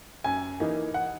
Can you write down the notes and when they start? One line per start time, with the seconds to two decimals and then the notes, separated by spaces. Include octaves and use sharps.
0.24 F#2 G#5
0.60 E3 A#3 D#4
0.94 F#5